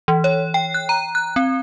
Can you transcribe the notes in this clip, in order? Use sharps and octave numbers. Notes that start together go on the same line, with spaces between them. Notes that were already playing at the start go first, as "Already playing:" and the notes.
E3
C#5
G5
F#6
A#5
F#6
C4